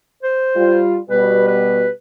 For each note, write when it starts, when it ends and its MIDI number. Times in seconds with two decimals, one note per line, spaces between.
0.23 0.80 72
0.56 0.97 55
0.56 0.97 65
1.10 1.85 47
1.10 1.85 55
1.10 1.47 71
1.48 1.90 71